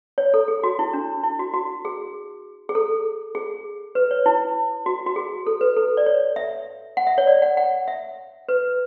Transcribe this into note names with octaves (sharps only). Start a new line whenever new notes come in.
C#5
A4
G#4
F#4
E4
D4
E4
F#4
F#4
G#4
G#4
A4
G#4
B4
C#5
E4
F#4
F#4
G#4
A4
B4
A4
D5
C#5
E5
F#5
E5
C#5
D5
F#5
F#5
E5
B4